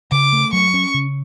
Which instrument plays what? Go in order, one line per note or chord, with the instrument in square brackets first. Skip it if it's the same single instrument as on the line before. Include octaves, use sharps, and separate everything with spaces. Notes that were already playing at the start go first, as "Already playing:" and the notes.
[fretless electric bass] C#3 [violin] D6
[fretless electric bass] A3
[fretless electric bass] F#3 [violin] C#6
[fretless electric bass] C#4
C#3